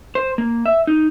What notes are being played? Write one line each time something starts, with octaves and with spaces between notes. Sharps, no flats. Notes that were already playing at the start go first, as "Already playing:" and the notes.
C5
A#3
E5
D#4